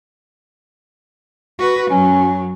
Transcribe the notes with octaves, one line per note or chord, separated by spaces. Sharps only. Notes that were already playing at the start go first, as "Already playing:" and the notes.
F#4 B4
F#2 F#3 C#4